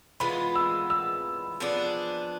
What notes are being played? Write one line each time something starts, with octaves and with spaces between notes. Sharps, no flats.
E3 G#3 B3 F4 B5
E6
E6
F3 B3 D4 G#4